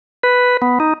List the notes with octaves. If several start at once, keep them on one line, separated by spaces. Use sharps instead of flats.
B4
B3
D#4